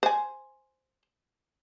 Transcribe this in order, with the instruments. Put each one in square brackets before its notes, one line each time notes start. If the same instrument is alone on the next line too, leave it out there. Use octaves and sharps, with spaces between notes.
[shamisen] C5 G#5